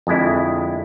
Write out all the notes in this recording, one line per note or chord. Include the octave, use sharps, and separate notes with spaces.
F2 D3 G#3 E4